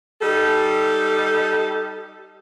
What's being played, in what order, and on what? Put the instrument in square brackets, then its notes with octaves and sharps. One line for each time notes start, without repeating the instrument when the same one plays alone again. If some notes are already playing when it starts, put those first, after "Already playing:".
[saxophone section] G3 D#4 A4